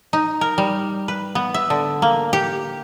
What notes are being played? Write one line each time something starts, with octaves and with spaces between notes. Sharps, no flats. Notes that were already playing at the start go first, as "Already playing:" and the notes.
D#4
A#4
G3
B4
B3
E5
D3
A#3
G4